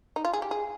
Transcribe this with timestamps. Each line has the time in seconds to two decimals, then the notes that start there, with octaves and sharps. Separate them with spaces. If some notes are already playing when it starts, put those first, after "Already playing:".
0.16 D#4
0.25 F4
0.33 G#4
0.42 G4
0.51 G#4